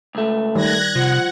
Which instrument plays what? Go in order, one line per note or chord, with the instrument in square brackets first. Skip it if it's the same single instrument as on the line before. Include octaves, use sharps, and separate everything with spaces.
[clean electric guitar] C#2 A3
[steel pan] D#3 G3 [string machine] F#6 G#6 A#6
[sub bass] C3 [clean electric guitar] F3 [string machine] F#5